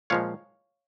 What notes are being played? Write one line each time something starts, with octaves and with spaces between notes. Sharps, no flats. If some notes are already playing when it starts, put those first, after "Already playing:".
A#2 F3 G#3 C#5 F5